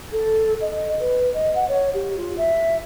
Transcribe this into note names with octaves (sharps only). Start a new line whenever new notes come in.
A4
D#5
B4
D#5
F#5
C#5
G4
F4
E5